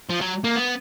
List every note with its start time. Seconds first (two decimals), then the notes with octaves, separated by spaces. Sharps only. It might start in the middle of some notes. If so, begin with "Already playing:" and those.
0.10 F3
0.21 F#3
0.44 A#3
0.55 B3